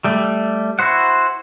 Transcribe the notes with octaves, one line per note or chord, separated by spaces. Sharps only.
G3 A3
E4 F#4 C5 F#5